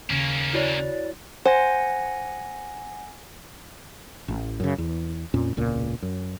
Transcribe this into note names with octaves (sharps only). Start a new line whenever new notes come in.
D#2 C#3 A#3 C#4
E4 F#4 C#5 D5
C5 F#5 G#5 A#6
A1
F#2 C#3
E2
F2 A#2 C#4
E1 C#2 A#2
F#2